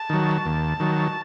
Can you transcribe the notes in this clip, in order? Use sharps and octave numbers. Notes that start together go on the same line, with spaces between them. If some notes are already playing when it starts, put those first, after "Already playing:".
Already playing: A5
D#3 F#3
D#2
D#3 F#3